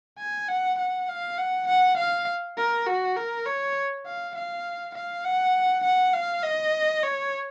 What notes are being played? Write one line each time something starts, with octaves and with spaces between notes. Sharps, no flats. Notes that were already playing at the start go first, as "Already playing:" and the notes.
G#5
F#5
F#5
F5
F#5
F#5
F5
A#4
F#4
A#4
C#5
F5
F5
F5
F#5
F#5
F5
D#5
C#5